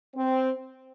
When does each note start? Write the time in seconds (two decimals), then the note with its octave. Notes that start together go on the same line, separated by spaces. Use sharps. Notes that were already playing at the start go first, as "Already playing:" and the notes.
0.15 C4